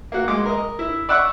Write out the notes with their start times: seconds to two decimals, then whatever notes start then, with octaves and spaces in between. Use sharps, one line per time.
0.12 A#3 F#4
0.28 G#3 D6
0.45 A#4 D#5
0.79 E4
1.09 D5 E5 F#5 C#6